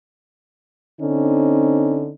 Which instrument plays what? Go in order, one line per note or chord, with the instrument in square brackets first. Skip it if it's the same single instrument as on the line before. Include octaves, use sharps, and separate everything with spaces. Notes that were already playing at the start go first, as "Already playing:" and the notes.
[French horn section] D3 C4 C#4 D#4